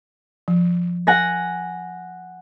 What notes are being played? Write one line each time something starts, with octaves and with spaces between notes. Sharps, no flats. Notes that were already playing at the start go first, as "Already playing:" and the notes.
F3
F#5 G#5 A#6